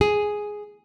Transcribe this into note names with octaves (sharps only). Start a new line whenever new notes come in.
G#4